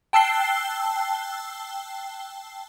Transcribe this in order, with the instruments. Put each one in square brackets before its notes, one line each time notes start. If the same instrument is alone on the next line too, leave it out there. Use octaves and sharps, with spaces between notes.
[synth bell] G5 A5 E6 F#6 C7 G7